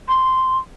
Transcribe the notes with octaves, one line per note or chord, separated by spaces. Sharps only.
C6